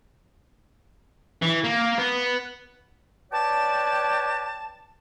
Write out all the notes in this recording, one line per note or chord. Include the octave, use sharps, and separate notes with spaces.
E3
A#3
B3
B4 C#5 D5 G5 A5